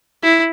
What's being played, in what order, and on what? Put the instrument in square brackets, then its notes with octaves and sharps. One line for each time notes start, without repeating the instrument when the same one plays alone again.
[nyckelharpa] E4